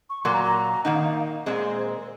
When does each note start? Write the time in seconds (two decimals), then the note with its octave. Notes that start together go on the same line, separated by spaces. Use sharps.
0.10 C#6
0.24 A#2 F#3 A#3 C6
0.34 A#5
0.44 A#5
0.85 D#3 A#3 D#4 F#5
0.95 F5
1.06 D#5
1.13 F5
1.20 D#5
1.46 A#2 G#3 C4
1.77 C5
1.87 A#4
1.97 A#4